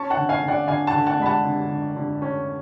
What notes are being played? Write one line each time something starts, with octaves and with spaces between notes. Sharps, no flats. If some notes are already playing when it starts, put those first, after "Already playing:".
Already playing: C#4 A5 C#6
F#5 A5
D3
F5 G#5
D3
D5 F#5
D3 F5 G#5
F#5 A5
D3
F#5 A5
G#3 B5
F#5 A5
D3
D3
D3
C#4